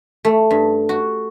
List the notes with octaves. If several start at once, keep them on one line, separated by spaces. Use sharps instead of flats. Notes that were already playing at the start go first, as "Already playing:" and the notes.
A3
G2
F#4